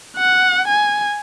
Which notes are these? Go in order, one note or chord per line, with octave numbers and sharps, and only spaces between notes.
F#5
G#5